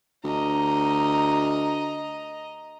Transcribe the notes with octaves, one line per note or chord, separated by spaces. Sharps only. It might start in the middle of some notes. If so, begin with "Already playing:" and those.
D2 D#5 A#5